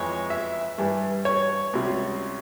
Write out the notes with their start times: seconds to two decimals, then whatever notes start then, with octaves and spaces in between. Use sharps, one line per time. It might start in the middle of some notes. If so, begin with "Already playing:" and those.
Already playing: F2 E3 G#3 C#5
0.30 E5
0.78 G2 E3 G3
1.25 C#5
1.73 C#2 C3 G3